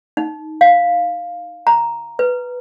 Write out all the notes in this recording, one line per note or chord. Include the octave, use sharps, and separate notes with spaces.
D#4
F5
A#5
B4